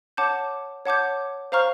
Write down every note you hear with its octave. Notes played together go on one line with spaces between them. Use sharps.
C#5 F#5 A5 D6 G6
C#5 F#5 A5 D6 G6
C5 F5 A#5 C#6 F6